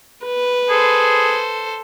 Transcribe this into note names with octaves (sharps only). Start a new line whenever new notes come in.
B4
G#4 A4 C5